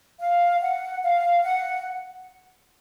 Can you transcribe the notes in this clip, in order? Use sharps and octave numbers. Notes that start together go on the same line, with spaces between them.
F5
F#5
F5
F#5